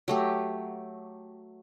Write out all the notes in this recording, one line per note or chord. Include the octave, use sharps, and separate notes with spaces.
F#3 A3 G4